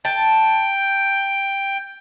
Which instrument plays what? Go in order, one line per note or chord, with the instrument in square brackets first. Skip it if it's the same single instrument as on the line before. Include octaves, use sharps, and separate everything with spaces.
[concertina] G5 [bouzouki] A5